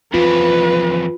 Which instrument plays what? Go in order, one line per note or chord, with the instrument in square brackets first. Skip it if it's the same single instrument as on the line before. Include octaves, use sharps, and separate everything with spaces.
[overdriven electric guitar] F2 E3 [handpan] F4 [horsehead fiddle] B4